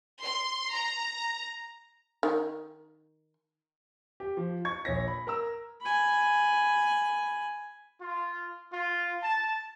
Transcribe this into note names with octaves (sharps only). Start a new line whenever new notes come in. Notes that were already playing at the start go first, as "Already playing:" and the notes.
C6
A#5
D#3
G4
F3
C#6 G#6
A#1 C#5 A#6
B5
A#4 A#5 E6
G#5 B5
F4
F4
A5